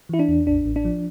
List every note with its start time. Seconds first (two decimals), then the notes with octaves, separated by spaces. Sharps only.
0.09 E3 E4
0.19 D4
0.28 E2
0.47 A1 D4
0.66 A1
0.76 D4
0.85 F3